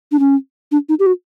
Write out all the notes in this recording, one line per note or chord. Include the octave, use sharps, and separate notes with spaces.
D4
C#4
D4
D#4
G4
F#4